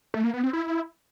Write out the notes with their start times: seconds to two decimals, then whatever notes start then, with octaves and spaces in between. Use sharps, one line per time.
0.14 A3
0.24 A#3
0.34 B3
0.43 C4
0.53 E4